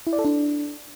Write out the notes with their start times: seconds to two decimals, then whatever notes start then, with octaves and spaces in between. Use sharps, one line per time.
0.07 E4
0.13 D5
0.19 A4
0.25 D4